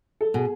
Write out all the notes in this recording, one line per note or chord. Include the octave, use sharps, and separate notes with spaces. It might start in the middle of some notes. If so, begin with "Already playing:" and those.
A4
B2 G#4